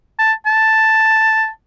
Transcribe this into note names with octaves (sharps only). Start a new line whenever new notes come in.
A5
A5